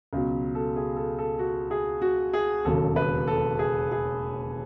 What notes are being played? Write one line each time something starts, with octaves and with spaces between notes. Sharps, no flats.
C#2 B2 F#3
A4
G#4
A4
A4
F#4
G#4
F#4
G#4
E1 D#2 C#3 F#3 A4
B4
A4
G#4
G#4